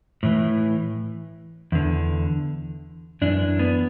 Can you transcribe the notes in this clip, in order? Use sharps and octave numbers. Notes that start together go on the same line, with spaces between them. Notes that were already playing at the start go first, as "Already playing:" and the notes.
A2 E3
E2 D3
F#2 E3 D4
B3